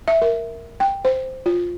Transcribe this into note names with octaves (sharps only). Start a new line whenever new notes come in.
E5
A#4
G5
C5
F4